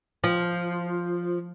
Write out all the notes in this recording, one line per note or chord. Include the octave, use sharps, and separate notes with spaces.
F3